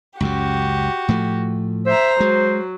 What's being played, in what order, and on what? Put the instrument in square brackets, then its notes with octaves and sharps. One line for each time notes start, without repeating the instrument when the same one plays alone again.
[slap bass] C#2 F#2 C#3 [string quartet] F#4 G4
[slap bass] A2 F3 A3
[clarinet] C5 [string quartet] E5 A#5
[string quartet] F#3 [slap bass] G#3